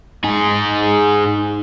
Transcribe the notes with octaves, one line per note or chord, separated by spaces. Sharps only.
D#4 G#4